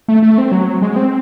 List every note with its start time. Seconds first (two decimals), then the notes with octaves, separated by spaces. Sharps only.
0.08 A3
0.23 A3
0.38 C4
0.52 F#3
0.82 G#3
0.96 C4